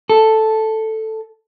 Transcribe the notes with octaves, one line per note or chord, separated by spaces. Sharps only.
A4